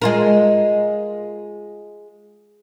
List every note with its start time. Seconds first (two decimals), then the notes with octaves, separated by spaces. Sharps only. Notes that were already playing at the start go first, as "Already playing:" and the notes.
0.02 G#3 F4 A#4